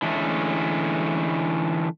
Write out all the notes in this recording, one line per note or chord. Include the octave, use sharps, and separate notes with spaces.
D3 E3 G#3 A3 C#4